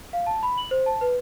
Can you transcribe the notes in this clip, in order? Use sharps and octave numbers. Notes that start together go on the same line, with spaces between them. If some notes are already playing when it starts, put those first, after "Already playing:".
F5
A5
B5
F#7
C5
A5
B4